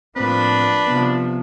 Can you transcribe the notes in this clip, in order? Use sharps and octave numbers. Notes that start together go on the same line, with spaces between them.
A2 F3 A#3 C4 D4 B4
C3 F3 B3